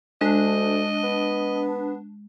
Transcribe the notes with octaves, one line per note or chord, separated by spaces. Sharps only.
D2 G#3 D4 D#5
B3